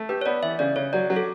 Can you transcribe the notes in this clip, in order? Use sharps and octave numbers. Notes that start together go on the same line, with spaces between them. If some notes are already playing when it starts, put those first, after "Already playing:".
Already playing: A3
G4 B4
C#5
B3 D5
E3 E5
C#3 D5
C#3 C#5
F#3 D5
F#3
A4